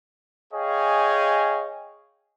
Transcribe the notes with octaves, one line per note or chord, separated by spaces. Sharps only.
G#4 C#5 D#5 F5 G5 G#5